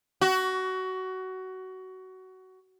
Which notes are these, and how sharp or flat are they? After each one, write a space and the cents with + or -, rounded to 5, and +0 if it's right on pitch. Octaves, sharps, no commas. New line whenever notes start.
F#4 +20